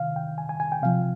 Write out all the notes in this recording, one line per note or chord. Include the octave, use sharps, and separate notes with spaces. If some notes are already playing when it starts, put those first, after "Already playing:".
Already playing: C3 D#3 F5
G5
G#5
G#5
G#5
G5
C3 F3 F5